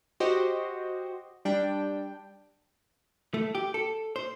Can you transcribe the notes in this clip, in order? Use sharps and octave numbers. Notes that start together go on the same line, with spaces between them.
F#4 G4 C5 D#5
G3 D4 G5
A3
G4
A4
C5